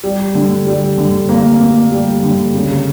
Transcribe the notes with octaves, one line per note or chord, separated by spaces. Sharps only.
G3
D3
G3
D3
A#3
A#3
G3
D3
C#3